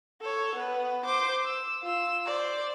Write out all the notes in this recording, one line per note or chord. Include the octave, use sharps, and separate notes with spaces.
A4 C#5
B3 B4
C5 D6
E6
F4 E6
C5 D5